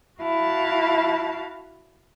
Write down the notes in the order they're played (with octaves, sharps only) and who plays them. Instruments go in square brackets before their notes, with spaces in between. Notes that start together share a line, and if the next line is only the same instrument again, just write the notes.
[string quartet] E4 F#4 F5 A5